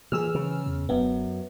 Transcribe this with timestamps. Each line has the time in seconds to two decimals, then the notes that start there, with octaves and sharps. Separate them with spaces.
0.12 A#2 E3 G#4 E6 F6
0.35 C#3
0.66 E2
0.89 D1 F#2 B3